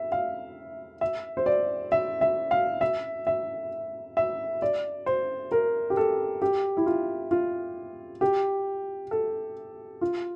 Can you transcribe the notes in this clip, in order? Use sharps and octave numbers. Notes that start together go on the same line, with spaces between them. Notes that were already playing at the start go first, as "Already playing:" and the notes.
Already playing: E5
F5
E5
C5
D5
E5
E5
F5
E5
E5
E5
D5
C5
A#4
G4
A4
G4
E4
F4
F4
G4
A4
F4